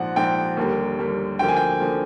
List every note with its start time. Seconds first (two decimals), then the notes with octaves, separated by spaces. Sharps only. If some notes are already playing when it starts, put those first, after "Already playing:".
Already playing: A#1 G#2 F3 F#5
0.16 A#1 G#2 F3 G5
0.57 D#2 D3 G3 A#3
0.98 D#2 D3 G3 A#3
1.39 D2 D3 F3 A#3 G5
1.48 G#5
1.56 G5
1.80 D3 F3 A#3